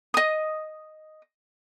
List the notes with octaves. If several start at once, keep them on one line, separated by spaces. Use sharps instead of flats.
D#5 D#6